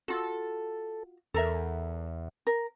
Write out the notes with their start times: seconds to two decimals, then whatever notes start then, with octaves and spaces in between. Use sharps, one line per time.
0.08 F4 F#4 A4
1.34 E2 A4 A#4 E5
2.47 A#4